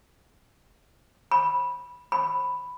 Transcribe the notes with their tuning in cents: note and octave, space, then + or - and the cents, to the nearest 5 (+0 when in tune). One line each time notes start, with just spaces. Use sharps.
B5 -10
B5 +5